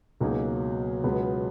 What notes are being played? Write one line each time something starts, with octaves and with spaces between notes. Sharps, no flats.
C#2 B2 F#3 A#3 D#4 G#4
C#2 B2 G#3 B3